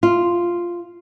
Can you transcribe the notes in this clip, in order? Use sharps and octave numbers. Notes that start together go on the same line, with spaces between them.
F4